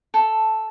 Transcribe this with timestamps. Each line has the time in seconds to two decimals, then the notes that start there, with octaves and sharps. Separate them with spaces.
0.14 A4